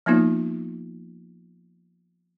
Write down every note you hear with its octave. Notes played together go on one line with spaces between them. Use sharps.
F3 A#3 B3 D#4 F4